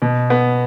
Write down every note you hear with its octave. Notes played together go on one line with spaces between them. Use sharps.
B2
B3